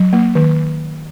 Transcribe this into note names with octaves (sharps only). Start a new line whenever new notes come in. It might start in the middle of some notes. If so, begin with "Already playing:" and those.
Already playing: F#3
A#3
D#3